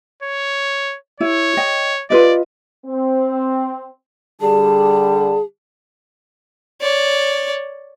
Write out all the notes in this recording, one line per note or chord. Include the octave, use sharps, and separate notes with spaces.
C#5
E4 C#5
D#5 G5
F4 B4 D5 D#5
C4
D3 G3 G#4 A5
C#5 D5